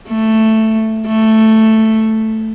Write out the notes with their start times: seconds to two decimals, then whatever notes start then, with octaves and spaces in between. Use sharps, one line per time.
0.09 A3
1.07 A3